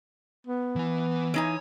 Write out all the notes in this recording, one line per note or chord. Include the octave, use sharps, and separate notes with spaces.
B3
E3 G#5
E3 D#4 C#5 G#5